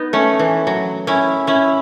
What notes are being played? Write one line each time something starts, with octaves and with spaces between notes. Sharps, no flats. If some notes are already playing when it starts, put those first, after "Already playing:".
Already playing: B3 D#4
A3 C#4
E3
F#3
C#4 E4
C#4 E4